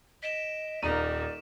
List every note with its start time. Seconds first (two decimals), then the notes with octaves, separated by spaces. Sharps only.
0.23 D#5 B6 D7 E7
0.82 D#1 A#3 D#4 D5 A#5 C#6 D#7